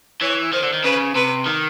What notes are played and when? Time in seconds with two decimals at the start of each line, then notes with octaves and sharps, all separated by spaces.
0.21 E3 C#5
0.53 D#3 C5
0.63 D3
0.73 D#3
0.84 C#3 B4
1.15 C3 B4
1.46 D#3